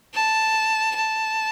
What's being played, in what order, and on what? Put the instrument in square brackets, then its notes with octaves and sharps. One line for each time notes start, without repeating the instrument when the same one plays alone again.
[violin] A5
A5